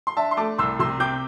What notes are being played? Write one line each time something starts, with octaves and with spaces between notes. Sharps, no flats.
C6
D4 E5 A5
C6
A3 A5 D6
C2 C6 E6
C3 C6 E6
C4 D6 G6